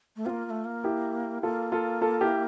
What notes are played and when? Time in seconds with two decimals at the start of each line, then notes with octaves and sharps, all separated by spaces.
0.16 A3
0.26 A#3 C4 F4
0.45 A#3
0.50 A3
0.65 A#3
0.84 E4 G4
1.43 A#3 F4 A4
1.72 F4 A4
2.01 F4 A4
2.21 E4 G4